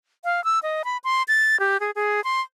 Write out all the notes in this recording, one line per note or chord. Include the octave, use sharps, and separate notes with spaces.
F5
E6
D#5
B5
C6
A6
G4
G#4
G#4
C6